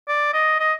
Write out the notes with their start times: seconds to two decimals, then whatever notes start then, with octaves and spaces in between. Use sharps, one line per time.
0.08 D5
0.34 D#5
0.60 D#5